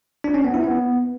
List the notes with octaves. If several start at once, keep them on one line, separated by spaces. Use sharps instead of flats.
D4
C#4
B3
E4
B3